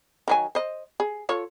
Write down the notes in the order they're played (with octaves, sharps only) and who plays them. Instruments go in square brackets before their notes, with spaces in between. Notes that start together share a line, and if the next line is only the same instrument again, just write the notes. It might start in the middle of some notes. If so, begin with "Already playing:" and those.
[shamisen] D#3 F#3 G#5
C5 D#5
G#4
F4 A4 C#5